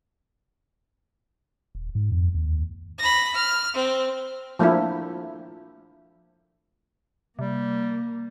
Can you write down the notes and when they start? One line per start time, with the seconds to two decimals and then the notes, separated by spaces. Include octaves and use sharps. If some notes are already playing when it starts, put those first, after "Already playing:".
1.75 D#1
1.95 G#2
2.12 F2
2.34 D#2
2.99 B5 A#6
3.35 F6
3.74 C4
4.59 F3 A3 A#3 D4 E4
7.39 C3 G3 A#3